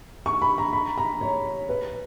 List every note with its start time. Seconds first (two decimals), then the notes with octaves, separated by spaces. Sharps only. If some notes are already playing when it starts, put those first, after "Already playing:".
0.26 C#6
0.42 B5
0.58 A#5
0.73 B5
0.98 A#5
1.21 C#5
1.69 B4